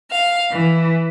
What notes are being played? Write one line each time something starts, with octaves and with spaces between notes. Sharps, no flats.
F5
E3